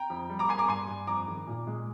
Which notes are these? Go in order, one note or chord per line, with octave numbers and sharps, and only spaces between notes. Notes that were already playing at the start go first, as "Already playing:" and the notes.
Already playing: G5 A#5
F2
G3
A#5 D6
A#3 G#5 C6
A#5 D6
G2 G#5 C6
G2
F2 A#5 D6
D#3
A#2
G#3